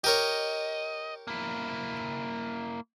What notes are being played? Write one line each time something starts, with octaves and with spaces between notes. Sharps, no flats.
G4 A#4 C#5 D#5
A#3 E4